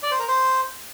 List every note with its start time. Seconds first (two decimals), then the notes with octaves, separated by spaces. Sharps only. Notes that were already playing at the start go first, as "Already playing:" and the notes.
0.03 D5
0.11 C5
0.20 A#4
0.28 C5